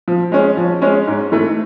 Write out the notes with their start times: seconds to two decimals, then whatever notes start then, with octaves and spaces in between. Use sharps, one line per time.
0.08 F3
0.32 G#3 C#4
0.57 F3
0.82 G#3 C#4
1.07 G#2
1.32 E3 A3